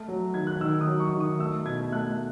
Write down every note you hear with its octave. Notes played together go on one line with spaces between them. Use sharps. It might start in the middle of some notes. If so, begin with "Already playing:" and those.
Already playing: A3
F#3
D#3 G#6
F#6
D#3 E6
D#6
F#3
C#6
D#3
D#6
A3 E6
B2 G#6
A3 F#6